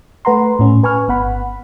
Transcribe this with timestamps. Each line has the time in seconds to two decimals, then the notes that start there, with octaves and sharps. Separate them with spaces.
0.25 A3 B4 F#5 A#5 C6
0.59 A2 C#4
0.83 B4 G#5 C#6 F6
1.08 G1 B3 F#5 B5